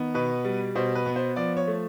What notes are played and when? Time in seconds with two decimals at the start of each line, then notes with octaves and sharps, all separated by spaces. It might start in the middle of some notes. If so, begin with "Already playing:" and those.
Already playing: D#3 B3
0.14 B2 B4
0.44 G3
0.75 B2 C5
0.95 B4
1.06 B3
1.16 C5
1.36 F3 D5
1.57 C#5
1.67 A3